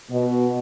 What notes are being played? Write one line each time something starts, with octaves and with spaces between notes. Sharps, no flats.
B2